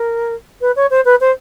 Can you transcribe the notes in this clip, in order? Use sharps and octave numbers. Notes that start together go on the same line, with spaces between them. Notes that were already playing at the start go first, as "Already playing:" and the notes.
Already playing: A#4
B4
C#5
C5
B4
C5